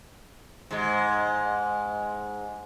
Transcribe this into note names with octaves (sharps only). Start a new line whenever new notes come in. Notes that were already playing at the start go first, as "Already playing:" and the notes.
G#2 G#3